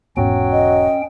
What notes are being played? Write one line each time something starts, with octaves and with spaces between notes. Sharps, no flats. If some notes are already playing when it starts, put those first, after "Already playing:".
E1 G#2 F#3 B3 C#4 G5
D#5